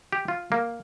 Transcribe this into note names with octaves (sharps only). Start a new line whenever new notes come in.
G4
F4
A#3